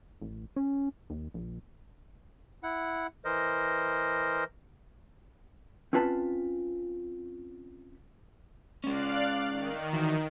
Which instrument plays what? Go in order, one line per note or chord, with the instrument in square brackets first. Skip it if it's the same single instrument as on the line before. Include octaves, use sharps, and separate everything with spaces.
[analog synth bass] A1
C#4
D#2
A#1
[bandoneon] E4 F#5
E3 A#4 C5 D#5
[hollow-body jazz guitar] C4 C#4 F4 B4 A5
[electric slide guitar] G#3 C#4 [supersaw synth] D5 F5 F#6
[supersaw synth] D#3
[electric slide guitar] E3 F#4